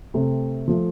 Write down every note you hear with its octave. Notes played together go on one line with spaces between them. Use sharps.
C3 A3 C4
F3 A3